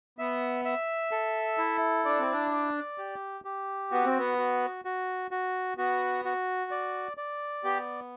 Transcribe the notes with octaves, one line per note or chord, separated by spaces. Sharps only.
B3 E5
E5
A4
E4
D4 D5
C4
D4
D5
G4
G4
B3 F#4
C4
B3
F#4
F#4
F#4
B3 F#4
F#4
D5
D5
B3 G4